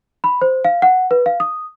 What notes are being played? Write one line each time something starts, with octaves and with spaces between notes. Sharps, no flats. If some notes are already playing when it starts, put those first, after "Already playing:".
B5
C5
F5
F#5
B4
F5
D#6